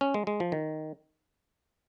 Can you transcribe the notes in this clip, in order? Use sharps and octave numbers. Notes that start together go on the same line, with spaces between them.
C#4
G#3
G#3
F3
D#3